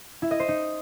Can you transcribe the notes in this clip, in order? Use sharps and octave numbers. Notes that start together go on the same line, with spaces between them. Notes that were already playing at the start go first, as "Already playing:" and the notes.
E4
D#5
C5
D#4